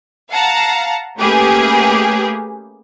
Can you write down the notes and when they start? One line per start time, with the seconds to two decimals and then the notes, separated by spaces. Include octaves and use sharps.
0.30 F5 F#5 A5 A#5
1.18 A3 A#3 C#4 G4 G#4 B4